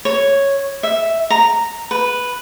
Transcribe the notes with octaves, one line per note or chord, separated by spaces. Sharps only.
C#5
E5
A#5
B4